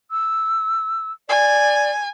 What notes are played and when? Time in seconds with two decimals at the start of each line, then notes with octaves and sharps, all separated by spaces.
0.11 E6
1.29 D5 G#5